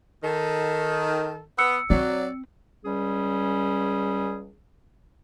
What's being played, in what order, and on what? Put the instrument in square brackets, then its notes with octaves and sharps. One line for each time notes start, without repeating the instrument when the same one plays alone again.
[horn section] D#3 [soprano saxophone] A4
[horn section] B3 [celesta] E6 C#7
[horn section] F#3 [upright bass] C4 [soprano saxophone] D5
[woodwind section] C#2 G3 C#4 G#4